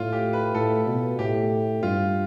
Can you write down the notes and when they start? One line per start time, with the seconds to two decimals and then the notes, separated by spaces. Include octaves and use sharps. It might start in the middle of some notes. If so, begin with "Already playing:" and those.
Already playing: A2 F4
0.13 G4
0.33 B4
0.54 A2 A4
0.87 B2
1.19 A2 G4
1.83 G2 F4